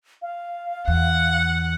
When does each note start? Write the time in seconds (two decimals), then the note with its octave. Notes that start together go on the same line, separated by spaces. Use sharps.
0.22 F5
0.88 E2 F#5